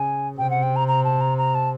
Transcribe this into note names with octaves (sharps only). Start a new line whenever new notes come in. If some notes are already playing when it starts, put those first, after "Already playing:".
Already playing: C#3 G#5
C3 G5
F#5
G5
A#5
A#5
A5
A#5
A#5
A5